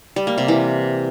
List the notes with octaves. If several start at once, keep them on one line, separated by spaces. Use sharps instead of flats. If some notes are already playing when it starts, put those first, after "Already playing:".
G3
A#3
C3
E3